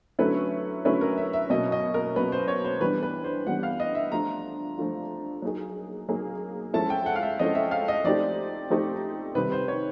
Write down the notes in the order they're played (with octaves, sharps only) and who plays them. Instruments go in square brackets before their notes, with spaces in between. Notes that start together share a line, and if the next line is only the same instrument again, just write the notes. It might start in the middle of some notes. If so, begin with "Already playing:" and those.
[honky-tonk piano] D3 F#3 A3 C#4 E4 [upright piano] B4
[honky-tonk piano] D3 F#3 A3 C#4 E4 [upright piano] B4
[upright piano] A#4
E5
E5
[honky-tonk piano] B2 F#3 A#3 C#4 [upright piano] D#5
[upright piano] D#5
A#4
[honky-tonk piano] B2 F#3 A#3 C#4 [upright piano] B4
[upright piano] C5
C#5
C5
[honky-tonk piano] E3 G3 B3 D4 [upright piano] B4
[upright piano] B4
C5
[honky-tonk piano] E3 G3 B3 D4 [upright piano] F#5
[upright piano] F5
D#5
E5
[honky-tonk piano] F3 A3 D4 F4 [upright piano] A#5
[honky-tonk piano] F3 A3 D4 F4
F#3 A#3 D#4 G#4
F#3 A#3 D#4 G#4
[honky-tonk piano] F3 G#3 C#4 E4 A4 [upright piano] A5
[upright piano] G5
F#5
F5
E5
[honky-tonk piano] F3 G#3 C#4 E4 A4 [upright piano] D#5
[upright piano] E5
F5
D#5
[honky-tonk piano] F3 A3 C4 D#4 G4 [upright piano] D5
[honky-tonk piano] F3 A3 C4 D#4 G4
[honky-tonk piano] C3 D#3 G3 C4 [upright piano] B4
[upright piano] C5
C#5